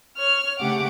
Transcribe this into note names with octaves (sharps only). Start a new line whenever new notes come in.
C#5 F6
C#3 A3 G4 F#5 D6